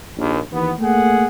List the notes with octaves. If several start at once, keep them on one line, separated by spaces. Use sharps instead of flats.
A#1 D#2
D#2 E3 B3
A3 A#3 G#4 F#5